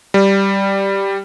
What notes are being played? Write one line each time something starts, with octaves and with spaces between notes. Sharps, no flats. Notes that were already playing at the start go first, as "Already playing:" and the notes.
G3